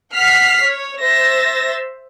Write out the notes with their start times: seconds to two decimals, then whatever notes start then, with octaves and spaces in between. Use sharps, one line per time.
0.13 F#5 F6 B6 C7
0.62 C#5
1.00 C5 E5 E6 A6 A#6